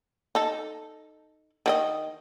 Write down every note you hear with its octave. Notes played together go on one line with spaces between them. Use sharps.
D#4 A4
D#3 F#4 D#5